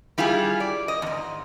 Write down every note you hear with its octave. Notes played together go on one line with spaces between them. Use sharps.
G3 E4 F4 G4 G#4
D5
D#5
E2 G#2